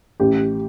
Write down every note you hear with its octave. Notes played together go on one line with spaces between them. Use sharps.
A1 G4